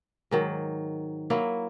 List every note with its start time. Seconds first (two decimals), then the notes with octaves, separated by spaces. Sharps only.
0.31 G#2 D#3 F#3
1.30 F#3 A#3 E4